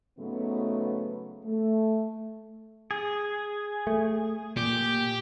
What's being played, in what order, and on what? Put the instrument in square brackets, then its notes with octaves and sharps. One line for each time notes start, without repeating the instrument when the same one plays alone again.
[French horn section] G#2 C#3 F#3 A3 B3
A3
[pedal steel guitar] G#4
[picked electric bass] A3
[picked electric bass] A#2 [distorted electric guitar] G4